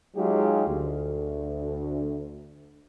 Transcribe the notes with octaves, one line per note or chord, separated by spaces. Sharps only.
F#3 G#3 D#4 F4 G4 G#4
D2